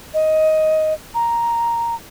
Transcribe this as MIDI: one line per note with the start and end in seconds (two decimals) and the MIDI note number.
0.14 0.93 75
1.15 1.95 82